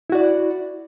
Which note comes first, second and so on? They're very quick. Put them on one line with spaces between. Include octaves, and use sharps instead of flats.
E4 F#4 D5